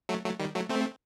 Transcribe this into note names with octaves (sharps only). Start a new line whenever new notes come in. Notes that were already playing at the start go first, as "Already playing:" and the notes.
F#3 A3
F#3 A3
D#3 G3
F#3 A3
A3 C4